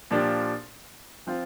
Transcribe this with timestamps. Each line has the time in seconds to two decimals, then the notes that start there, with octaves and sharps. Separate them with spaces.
0.11 A#2 F3 D4 G4
1.27 F3 C4 F4